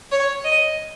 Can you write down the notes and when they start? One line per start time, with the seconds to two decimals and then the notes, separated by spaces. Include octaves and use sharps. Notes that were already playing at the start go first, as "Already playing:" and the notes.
0.12 C#5
0.44 D#5